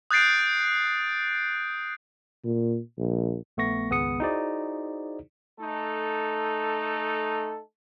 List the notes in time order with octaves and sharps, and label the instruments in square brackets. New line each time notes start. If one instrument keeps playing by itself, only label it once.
[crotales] D#6 F#6 G6 A6 C7 D7
[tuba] A#2
A#1
[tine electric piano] A#1 A3 B3 C#6 A#6
G#1 C#2 B3 G#4 D#6 C#7
D#4 E4 F#4 G#4 C5 D5
[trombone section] A3 D#4 A4